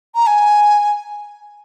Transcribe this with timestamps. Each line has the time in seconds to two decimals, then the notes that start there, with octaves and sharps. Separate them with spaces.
0.15 A#5
0.27 G#5